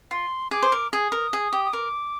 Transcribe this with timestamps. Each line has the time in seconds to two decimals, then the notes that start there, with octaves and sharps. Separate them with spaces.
0.11 F4 C6
0.51 G#4 D6
0.63 C5
0.72 A#4
0.93 G#4 D#6
1.12 A#4
1.33 G#4
1.53 G4
1.65 D#6
1.73 A#4 D6